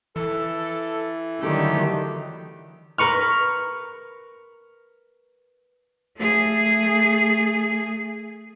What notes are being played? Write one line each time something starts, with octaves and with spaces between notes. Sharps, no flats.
E3 A4
D3 D#3 F#3 G3 A3 G4
A#4 B4 C#6 F6
A3 G#4